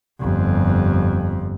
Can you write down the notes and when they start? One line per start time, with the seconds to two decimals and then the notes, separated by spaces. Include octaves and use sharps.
0.20 G1 F2